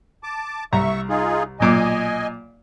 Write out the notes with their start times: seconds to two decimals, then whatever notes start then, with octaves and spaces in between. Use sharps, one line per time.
0.23 A5 D6
0.73 C2 E5 A#5 C#6
1.09 D#4 F4 G#4
1.60 B1 A#2 D#5 G#5 D6